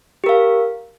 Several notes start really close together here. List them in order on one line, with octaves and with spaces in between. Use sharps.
G4 A#4 F5